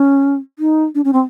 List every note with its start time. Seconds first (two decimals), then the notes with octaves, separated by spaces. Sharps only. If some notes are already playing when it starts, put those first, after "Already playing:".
Already playing: C#4
0.59 D#4
0.95 D4
1.05 C#4
1.13 C4